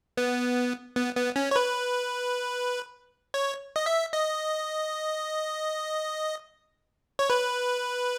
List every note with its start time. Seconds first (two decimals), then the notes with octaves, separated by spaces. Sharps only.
0.17 B3
0.96 B3
1.16 B3
1.36 C#4
1.51 C#5
1.56 B4
3.34 C#5
3.76 D#5
3.86 E5
4.13 D#5
7.19 C#5
7.30 B4